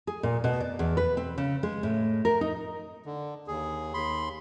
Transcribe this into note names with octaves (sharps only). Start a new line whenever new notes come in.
G#4
A#2
B2
D5
E2
B4
C4
C#3
G#3
A2
A#4
D#4
D3
D#2 G#4
D#2 B5 C6